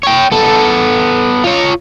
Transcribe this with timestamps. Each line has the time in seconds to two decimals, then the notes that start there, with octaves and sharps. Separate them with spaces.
0.03 C#5 G5
0.32 B3 A4
1.44 F4 C#5